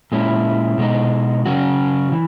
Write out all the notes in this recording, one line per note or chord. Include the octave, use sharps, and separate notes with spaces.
A#2 G#3 C#4 E4
B2 G#3 D#4
C#3 F#3 C#4 F#4
E3